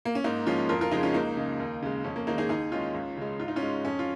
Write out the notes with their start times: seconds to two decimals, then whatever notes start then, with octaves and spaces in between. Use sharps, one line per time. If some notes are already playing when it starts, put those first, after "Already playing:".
0.05 A#3
0.15 C#4
0.24 G#2 A#3 D#4
0.46 F3 G#3 C#4 F4
0.69 F2 F4 A#4
0.81 F4 A#4
0.92 C#3 F3 G#3 D#4 G#4
1.03 C#4 F4
1.14 C#2 A#3 D#4
1.37 C#3 G#3
1.60 D#2
1.82 C#3 G#3
2.04 F2 C#4
2.16 A#3
2.27 D#3 G#3 A#3 D#4
2.38 D#4 G#4
2.49 D#2 D#4 G#4
2.72 D#3 G#3 C#4 F4
2.94 C#2
3.17 C#3 G#3
3.40 G#2 F4
3.48 D#4
3.56 C#4 F4
3.62 G#3
3.85 F2 C#4
3.99 F4